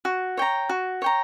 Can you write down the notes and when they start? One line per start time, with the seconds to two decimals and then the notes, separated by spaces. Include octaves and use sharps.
0.05 F#4
0.37 C#5 G5 A#5
0.69 F#4
1.02 C#5 G5 A#5